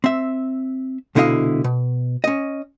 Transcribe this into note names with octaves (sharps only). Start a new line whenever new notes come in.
C4 E5
C2 B2 D3 E4 D#5 F5
B2
C#4 D#5